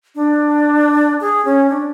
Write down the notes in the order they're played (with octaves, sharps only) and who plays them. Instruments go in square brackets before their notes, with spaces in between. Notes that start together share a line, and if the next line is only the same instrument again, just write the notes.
[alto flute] D4
G#4
C#4
D4